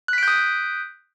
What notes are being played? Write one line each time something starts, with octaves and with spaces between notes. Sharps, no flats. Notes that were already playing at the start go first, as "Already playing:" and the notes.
D#6 F#6 G6 B6 D7